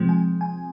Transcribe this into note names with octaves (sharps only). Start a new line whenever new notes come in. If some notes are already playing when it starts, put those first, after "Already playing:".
Already playing: C3 F3 G#3 C4
G#5
G#5